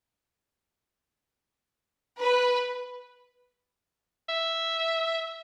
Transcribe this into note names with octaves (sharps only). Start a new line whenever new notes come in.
B4
E5